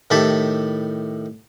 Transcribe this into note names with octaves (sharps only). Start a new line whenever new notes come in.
A2 D#3 E4 G4 A5 B5